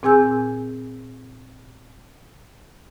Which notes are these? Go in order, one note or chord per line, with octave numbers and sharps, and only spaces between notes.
A#2 C4 G#4 G#5 E6 G6